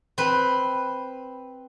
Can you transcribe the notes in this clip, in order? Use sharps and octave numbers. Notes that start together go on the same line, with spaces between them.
C4 B4